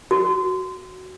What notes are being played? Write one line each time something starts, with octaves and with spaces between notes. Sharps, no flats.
F#4